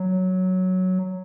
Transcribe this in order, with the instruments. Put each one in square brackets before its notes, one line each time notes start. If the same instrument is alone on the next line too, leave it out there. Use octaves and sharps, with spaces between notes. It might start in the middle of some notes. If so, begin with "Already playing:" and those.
Already playing: [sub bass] F#3